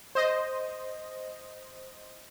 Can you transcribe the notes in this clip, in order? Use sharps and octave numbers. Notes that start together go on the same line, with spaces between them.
C5 D#5